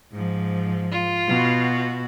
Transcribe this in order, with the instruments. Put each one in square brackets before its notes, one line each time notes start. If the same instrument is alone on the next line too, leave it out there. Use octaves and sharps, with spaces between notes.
[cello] G#2 F3
[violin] F4
[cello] B2 F#4